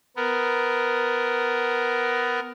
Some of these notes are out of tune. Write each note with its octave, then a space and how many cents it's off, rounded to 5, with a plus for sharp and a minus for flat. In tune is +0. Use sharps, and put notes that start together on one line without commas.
B3 +15 A#4 +10